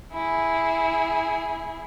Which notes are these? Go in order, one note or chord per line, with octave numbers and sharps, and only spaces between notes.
E4 G#4